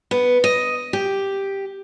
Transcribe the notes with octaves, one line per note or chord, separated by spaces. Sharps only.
B3
D#5
G4